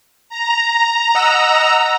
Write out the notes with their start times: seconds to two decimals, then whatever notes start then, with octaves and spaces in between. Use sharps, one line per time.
0.29 A#5
1.15 D#5 F#5 E6